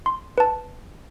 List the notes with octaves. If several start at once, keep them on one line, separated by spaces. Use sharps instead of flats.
C6
B4 A5